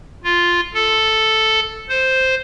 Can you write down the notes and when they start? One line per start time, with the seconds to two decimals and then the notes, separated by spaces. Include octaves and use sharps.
0.24 F4
0.74 A4
1.89 C5